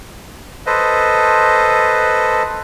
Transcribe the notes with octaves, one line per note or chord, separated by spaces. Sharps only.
A4 B4 C5 D#5